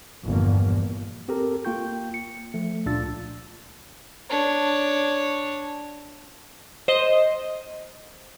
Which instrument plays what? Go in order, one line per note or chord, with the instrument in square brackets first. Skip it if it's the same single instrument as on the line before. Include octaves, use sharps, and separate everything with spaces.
[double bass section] G1 E2 A#2 F3 A#3
[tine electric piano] C4 G4 A4 A#4 A#5
A#3 F4 G5 C#6 G6
C#7
F3 A3
C#2 A#2 D4 F4 E6 A6
[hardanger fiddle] D4 C#5
[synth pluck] C5 D#5